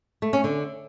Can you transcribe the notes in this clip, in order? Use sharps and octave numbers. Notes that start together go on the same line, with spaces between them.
A3
C#4
D3